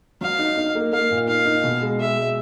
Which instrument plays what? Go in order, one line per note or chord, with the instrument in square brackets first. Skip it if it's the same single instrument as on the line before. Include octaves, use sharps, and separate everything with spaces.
[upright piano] F#3 [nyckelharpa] F5
[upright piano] D#4
D#4
A#3
[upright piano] A#3 [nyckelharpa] F5
[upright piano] A#2
[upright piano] D#4 [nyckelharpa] F5
[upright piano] D#4
B2
G#3
[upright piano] G#3 [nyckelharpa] E5
[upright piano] G#3